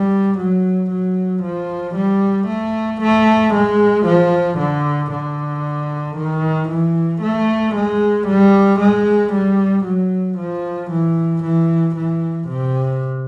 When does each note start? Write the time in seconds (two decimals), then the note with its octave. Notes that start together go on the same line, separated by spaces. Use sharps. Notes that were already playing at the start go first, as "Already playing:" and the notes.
Already playing: G3
0.38 F#3
0.91 F#3
1.43 F3
1.96 G3
2.48 A3
3.01 A3
3.54 G#3
4.06 F3
4.58 D3
5.11 D3
6.17 D#3
6.69 E3
7.22 A3
7.75 G#3
8.28 G3
8.80 G#3
9.33 G3
9.85 F#3
10.38 F3
10.91 E3
11.43 E3
11.96 E3
12.48 C3